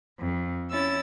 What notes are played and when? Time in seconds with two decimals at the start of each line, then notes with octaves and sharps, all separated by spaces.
0.20 F2
0.72 C#4 E4 E6 A6